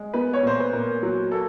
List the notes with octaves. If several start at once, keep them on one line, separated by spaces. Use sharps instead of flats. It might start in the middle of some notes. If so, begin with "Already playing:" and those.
Already playing: G#3
B3 B4
C#5
A#2 C5
B4
A#2 A#4
F#3
A#3 A4